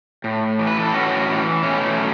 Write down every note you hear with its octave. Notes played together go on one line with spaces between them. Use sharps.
A2
E3
B4
A4
A2 C#4 F#4
E3
B2 A3 C#4
F#3